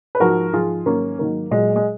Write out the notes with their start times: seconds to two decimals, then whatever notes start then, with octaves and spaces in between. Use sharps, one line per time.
0.15 B4
0.20 G#2 F3 F#4 A#4
0.53 G#2 F3 F4 G#4
0.86 G#2 D#3 F#3 A#3 C#4
1.19 G#2 D#3 F#3 A#3
1.51 A#2 F#3 G#3
1.76 G#3